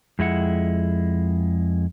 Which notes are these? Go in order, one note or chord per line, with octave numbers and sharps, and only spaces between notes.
F2 G#3 E4 F#5